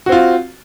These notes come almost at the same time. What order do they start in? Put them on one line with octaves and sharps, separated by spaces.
F#4 C4 F4